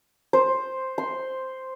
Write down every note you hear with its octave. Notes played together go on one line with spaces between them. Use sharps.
C5
C6